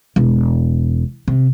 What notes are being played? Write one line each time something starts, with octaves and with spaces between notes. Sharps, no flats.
E1
C3